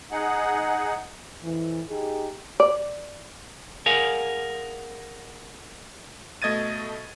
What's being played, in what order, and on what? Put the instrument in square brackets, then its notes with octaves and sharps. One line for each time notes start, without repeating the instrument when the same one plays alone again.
[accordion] D#4 G#4 F#5
[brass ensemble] F2 E3
D#4 G4 G#4
[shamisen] D5
[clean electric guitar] G#4 A#4 F5 F#5 G#5
[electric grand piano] B2 A3 D#5 G#6 A6 D#7